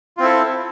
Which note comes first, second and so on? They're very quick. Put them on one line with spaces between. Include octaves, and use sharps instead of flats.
F4 C4 E4 A4